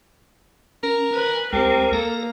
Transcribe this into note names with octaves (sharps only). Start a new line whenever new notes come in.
C#4 A#4
B4 G#5
D2 G#3 C4 G4 A#4
A#3 A4 A#4